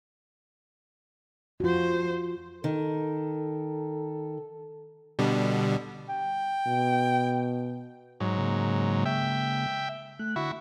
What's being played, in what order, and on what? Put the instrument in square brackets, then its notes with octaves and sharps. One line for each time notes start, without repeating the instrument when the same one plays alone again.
[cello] F2 C5 [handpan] F4 F#4
[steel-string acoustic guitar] D#3 [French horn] A4
[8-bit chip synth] B2 D3 G3
[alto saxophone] G5
[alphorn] B2
[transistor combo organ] G#2 F#3
[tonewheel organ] C#3 G#3 A#3
[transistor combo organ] E5 G5
[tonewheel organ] A3 F#6
[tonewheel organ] D3 [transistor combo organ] E4 F#4